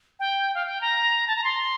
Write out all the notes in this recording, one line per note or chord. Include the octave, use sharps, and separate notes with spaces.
G5
F5
G5
A#5
A5
A#5
C6